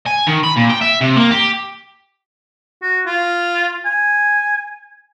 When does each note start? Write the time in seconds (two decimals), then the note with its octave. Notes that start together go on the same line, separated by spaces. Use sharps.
0.06 G#5
0.27 D#3
0.43 B5
0.56 A#2
0.69 G5
0.81 E5
1.01 C3
1.16 A#3
1.31 G4
2.82 F#4
3.06 F4
3.85 G#5